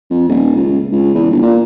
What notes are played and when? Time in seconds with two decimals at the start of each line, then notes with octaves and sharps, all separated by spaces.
0.10 F2
0.28 D#1
0.56 C#2
0.92 C#2
1.15 E2
1.30 G1
1.42 A#2